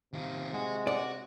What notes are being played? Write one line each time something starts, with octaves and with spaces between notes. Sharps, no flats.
C3 D#3 F4
G#3 F#4
F#4 D5